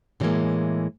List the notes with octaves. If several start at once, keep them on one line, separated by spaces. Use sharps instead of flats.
A2 D3 E3 G3 G#3 A#3